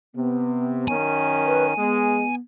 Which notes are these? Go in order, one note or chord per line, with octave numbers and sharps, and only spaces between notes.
C3 B3
F#2 D#3 C#4 G#5
B4
G#3 B3